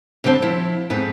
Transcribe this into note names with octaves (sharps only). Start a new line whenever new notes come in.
F2 D3 G3 C4 C5 A5
F3 E4
F2 G#2 B3 C4